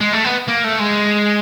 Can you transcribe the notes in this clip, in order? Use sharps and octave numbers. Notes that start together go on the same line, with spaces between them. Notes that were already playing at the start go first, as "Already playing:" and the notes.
G#3
A3
B3
A#3
A3
G#3